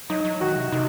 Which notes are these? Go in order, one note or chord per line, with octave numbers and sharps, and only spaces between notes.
F#3 D#4
F#3
D#3 F#4
C3
C3 D#4